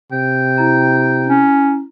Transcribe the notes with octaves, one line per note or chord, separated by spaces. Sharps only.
C3 G5
E4 A#5
C#4